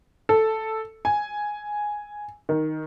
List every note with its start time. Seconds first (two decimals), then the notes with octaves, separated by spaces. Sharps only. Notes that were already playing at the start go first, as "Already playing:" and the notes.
0.29 A4
1.05 G#5
2.49 D#3